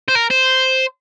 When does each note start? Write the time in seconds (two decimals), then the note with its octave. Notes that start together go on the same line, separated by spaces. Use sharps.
0.08 C5
0.15 A#4
0.31 C5